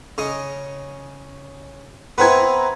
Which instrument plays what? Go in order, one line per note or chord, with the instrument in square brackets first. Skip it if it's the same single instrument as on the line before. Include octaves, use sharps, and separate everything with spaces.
[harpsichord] C#3 D#5
[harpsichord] B3 C4 E4 [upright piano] B4 A#5 G#6